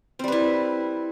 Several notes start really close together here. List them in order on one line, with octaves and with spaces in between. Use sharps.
C4 G3 B4 E4